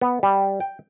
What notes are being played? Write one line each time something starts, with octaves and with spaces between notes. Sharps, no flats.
B3
G3
G5